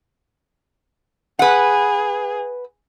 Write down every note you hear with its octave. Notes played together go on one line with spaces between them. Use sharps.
G#4 B4 F#5